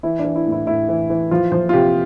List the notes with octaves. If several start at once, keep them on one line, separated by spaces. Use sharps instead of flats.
E3 E4
D4
E3
E4
A2
E4
A2 E4
E3
E3
F3 F4
F3 C5
F4
C3 G4